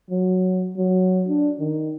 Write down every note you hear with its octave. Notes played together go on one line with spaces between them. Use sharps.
F#3
F#3
D4
D#3